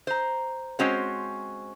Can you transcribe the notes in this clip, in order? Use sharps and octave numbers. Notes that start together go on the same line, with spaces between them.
C5 A#5
G#3 C4 C#4 F#4 C5